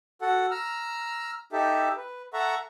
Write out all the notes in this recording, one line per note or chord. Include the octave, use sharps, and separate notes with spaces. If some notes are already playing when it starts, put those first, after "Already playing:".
F#4 A4 F#5
A#5 E6 F6
D#4 G4 A4 E5
B4
A4 E5 F#5 A#5 C#6